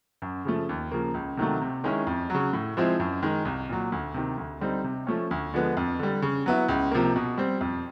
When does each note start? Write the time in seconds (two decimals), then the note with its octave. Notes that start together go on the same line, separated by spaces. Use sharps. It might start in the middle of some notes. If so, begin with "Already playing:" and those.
0.22 F#2
0.45 C#3 F3 A3
0.69 D#2
0.91 C#3 F3 A#3
1.14 C#2
1.37 C3 D#3 F#3 A3
1.61 C3
1.84 D#3 G#3 C#4 E4
2.07 F2
2.30 C#3 F#3
2.53 A2
2.77 F3 G#3 C4 E4
3.00 F#2
3.23 D#3 G#3
3.45 C2
3.69 A#2 F#3
3.92 D2
4.14 C3 D#3
4.38 D2
4.60 D3 G3 C4 D#4
4.84 C3
5.07 F3 A3 C#4
5.31 D2
5.54 D3 F3 G#3 B3
5.77 F2
5.99 D3 G3
6.22 C#3
6.46 F#3 B3 E4
6.69 C#2
6.91 C3 F3 A#3
7.16 B2
7.38 G3 C4
7.61 F2